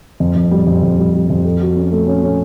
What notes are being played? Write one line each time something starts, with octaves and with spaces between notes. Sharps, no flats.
F2
F2
G3
F2
F2
G3
G3
F2
A4
F#4
C#4
A3
C#4
C#4